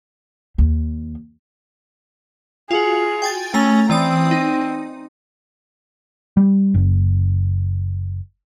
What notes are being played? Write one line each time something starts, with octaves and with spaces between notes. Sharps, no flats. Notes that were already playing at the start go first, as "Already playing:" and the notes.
D#2
F4 F#4 G#4
G5 G#5 A6
A3 C#4 A#5 A6
E3 C4 D5 D#6
D#4
G3
F#1